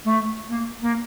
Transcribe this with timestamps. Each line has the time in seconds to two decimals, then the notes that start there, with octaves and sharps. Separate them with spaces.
0.05 A3
0.49 A#3
0.82 A#3